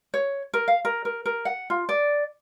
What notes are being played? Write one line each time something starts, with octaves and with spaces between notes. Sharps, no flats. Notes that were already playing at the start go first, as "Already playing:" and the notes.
C#5
A#4
F5
A#4
A#4
A#4
F#5
F4
D5